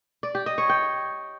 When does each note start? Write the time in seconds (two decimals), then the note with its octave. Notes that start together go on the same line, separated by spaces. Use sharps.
0.23 D5
0.35 G4
0.46 D#5
0.58 C#5
0.69 G5